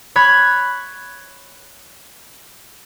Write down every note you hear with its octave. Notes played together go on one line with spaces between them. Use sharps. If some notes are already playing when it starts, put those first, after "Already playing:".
C#5 B5 F#6 G#6